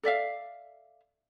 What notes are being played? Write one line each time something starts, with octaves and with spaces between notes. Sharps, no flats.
A4 D5 E5 F5